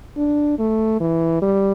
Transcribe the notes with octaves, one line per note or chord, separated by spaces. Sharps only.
D4
A3
E3
G3